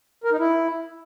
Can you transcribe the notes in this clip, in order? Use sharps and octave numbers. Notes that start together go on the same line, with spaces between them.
A#4
D#4
E4